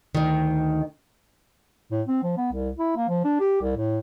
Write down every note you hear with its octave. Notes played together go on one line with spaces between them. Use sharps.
D2 D#3
A2
C4
F3
B3
C2
E4
A#3
F3
D4
G4
C2
A2